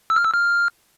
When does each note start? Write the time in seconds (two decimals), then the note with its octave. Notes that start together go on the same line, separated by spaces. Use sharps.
0.10 E6
0.16 F6
0.24 E6
0.34 F6